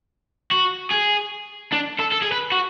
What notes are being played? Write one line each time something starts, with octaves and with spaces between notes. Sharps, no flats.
F#4
G#4
D4
A4
A4
G#4
B4
F#4